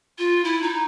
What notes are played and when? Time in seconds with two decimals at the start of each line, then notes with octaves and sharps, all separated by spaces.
0.18 F4
0.44 E4
0.62 D#4